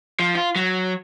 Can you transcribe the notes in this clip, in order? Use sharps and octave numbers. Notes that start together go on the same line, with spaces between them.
F3
F4
F#3